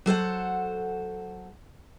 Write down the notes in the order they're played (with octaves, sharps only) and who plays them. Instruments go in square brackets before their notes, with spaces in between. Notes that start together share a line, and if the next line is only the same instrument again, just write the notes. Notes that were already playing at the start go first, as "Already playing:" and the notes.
[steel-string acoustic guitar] F#3 A4 C5 F#5